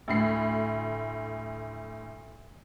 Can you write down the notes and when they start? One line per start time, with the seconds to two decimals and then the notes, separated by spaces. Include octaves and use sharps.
0.08 D2 A2 C7